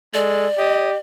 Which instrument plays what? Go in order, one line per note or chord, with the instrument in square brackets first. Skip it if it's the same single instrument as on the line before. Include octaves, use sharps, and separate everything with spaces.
[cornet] G#3 [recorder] A4 [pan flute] D5
[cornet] G4 [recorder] D#5